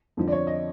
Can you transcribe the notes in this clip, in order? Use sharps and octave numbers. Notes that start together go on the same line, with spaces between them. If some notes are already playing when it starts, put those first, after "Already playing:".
F2 D3 F3
D5
C#5
D#5